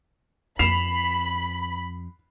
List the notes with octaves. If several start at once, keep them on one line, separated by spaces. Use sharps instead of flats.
F2 B5 C7 E7 F7